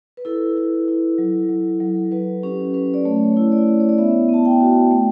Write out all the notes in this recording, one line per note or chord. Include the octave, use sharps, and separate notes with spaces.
B4
E4 A4
E4
E4
F#3
F#3
F#3
F#3 B4
C#4 G4
C#4 B4
D5
A3 C#5
E4
D5
E4
C#5
D5
B3 E5
B3 A5
G5
F#4
A3